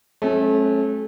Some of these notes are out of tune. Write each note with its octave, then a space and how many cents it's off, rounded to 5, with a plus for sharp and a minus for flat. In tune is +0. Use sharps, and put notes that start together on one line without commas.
F#3 +15 A3 -30 C#4 -40